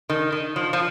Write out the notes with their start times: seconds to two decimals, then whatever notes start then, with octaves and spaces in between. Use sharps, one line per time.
0.10 D#3
0.32 D#3
0.56 F3
0.73 F3